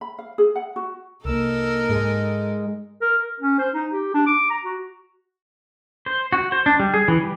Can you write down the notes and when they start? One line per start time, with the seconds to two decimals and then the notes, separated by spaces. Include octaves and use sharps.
0.01 B5
0.19 F5
0.38 G#4
0.56 F#5
0.76 F#4
1.25 C2 A#3 D#4 A4 A#4 E6
1.89 G#2 G#3
3.01 A#4
3.23 A#4
3.40 C#4
3.59 C5
3.74 D#4
3.92 G4
4.14 D4
4.27 D6
4.50 A#5
4.64 F#4
6.06 C5
6.33 F#4
6.52 C5
6.66 D4
6.80 G3
6.94 G#4
7.08 E3
7.21 G3